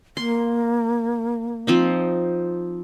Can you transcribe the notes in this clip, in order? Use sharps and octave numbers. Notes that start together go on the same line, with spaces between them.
A#3 C6
F3 C4 D#4